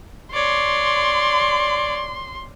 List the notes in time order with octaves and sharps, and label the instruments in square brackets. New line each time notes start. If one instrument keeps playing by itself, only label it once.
[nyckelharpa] C#5 D5 [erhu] C6